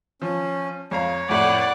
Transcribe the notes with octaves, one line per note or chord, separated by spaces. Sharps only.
F3 C#4
F2 C#5 F5 A#5
F2 A2 D5 F#5